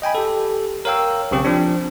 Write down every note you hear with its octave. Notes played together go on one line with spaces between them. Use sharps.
D#5 G5 G#5 B5
G4 A4
A#4 C#5 F5 G5 E6
B1 C#3 C4 G4
F3 C4 D4